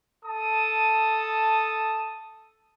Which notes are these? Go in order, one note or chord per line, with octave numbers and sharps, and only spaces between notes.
A4 A5 D#6